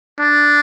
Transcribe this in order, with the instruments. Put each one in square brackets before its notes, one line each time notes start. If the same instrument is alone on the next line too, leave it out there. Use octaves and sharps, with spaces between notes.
[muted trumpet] D4